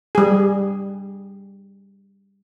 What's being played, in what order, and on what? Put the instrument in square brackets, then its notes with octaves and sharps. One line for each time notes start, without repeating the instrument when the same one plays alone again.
[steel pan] G3 G#4